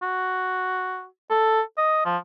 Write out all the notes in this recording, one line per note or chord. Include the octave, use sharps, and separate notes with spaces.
F#4
A4
D#5
F3